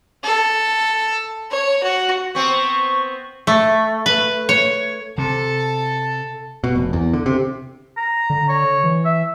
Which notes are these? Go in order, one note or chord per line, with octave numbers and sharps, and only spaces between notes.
A4
C#5
F#4
B3 C4 C#6
A3
B4
C#5
C3 A4
B2
F1
E2
D3
C3
A#5
D3
C#5
E3
E5